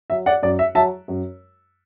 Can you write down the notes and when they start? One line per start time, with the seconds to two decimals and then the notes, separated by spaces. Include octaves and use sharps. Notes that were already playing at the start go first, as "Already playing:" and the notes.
0.10 F#3 E5
0.26 D5 F#5
0.43 F#2 D5
0.59 E5
0.75 F#3 E5 A5
1.08 F#2